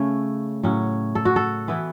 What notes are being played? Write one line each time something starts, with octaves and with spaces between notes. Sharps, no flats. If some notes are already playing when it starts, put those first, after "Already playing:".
Already playing: C#3 A3 C#4
A2 F#3 C#4
A4
F#4
A4
E3 B3 E4